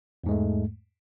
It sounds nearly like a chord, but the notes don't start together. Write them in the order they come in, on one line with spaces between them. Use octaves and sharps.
E2 G#2 G#3 A3